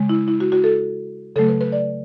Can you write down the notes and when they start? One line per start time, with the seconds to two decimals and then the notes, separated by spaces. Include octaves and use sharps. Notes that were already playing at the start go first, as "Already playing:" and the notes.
Already playing: C#3 G#3
0.09 E4
0.28 E4
0.40 F#4
0.52 F#4
0.64 A4
1.36 C#3 F#3 A3 A4
1.48 B4
1.61 B4
1.72 D5